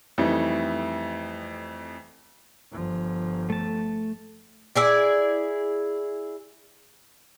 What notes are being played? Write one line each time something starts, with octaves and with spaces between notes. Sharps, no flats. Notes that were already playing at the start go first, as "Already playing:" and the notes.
F2 E3 G3 A3 D#4
G1 F3
A3 A5
E4 G#4 D5